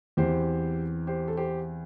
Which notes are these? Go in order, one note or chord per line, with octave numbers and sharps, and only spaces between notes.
E2 E3 C4 G4 C5
G4 C5
A4
G4 C5